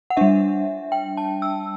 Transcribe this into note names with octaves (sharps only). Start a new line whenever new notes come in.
F#5
G3 D4 E5
G5
A5
E6